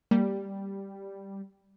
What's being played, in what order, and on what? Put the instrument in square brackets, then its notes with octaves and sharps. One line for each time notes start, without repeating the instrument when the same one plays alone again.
[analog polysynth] G3 [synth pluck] A#3